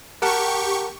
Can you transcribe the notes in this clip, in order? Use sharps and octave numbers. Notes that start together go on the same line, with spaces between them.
G4 A#4 F#5 A5 C#6